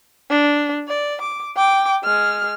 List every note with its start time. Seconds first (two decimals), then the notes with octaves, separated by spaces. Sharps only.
0.30 D4
0.88 D5
1.21 D6
1.56 G5 D6
2.04 G#3 F6